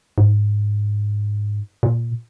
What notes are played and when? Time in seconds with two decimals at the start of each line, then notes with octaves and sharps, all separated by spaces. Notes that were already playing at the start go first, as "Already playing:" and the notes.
0.18 G#2
1.83 A#2